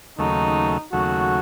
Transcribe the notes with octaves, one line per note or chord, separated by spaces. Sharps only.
D#2 C#3 F#3 A3 D#4
D#2 C#3 F#3 A3 F#4